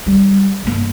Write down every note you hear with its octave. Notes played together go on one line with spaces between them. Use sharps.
G3
G1 A#3